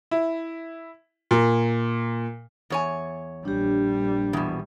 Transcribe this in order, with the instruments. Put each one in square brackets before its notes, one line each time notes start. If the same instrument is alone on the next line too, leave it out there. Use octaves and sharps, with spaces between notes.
[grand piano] E4
A#2
[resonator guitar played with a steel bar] E2 C#5 G#5
[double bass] A#1 G3 [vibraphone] D4 G4
[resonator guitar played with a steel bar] E2 B2